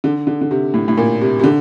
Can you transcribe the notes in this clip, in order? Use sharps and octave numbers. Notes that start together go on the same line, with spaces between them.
D3
D3
D3
C3
A2
A2
A#2
C3
C3
D3